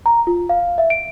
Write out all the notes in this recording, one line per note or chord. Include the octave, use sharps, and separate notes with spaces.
A#5
F4
F5
E5
D7